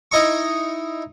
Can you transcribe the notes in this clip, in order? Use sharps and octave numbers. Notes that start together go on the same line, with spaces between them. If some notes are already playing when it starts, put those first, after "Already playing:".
D#4 E4 D#5 A#5 C#6